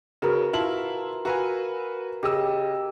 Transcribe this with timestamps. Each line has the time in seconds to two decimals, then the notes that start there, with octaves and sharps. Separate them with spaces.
0.22 C#3 F#4 A#4 B4
0.53 E4 F4 A5 F#7
1.25 F#4 B4 F5 G#5 A#5 E6
2.23 C#3 G4 D#5 E6